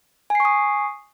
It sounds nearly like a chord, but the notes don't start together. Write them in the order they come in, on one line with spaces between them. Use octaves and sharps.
G#5 C7 C#6 D#6